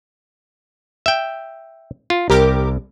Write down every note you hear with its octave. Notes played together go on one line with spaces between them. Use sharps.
E5 G5
F4
C2 G4 A#4 D6